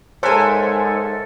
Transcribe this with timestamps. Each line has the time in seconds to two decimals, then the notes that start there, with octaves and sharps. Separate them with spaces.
0.23 G#2 A4 A#4 C5 C#5 E5 G#5 F#6